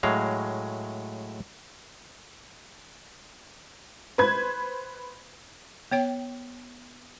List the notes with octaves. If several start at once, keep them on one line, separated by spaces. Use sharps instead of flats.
A2 F#3 G#3 F5
B4 C5 G#6
B3 C#5 G5